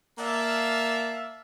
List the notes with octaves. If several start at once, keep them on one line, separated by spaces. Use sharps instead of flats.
A#3 D5 E5 F5 A5